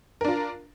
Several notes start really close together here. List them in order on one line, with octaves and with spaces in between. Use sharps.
A#4 D4 F4